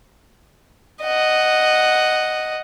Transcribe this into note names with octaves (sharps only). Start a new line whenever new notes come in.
D#5 F#5